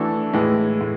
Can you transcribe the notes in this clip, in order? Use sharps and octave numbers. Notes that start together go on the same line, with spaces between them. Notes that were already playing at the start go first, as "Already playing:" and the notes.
Already playing: E3 A3 D4 F#4 A4
A2 E3 G#3
A2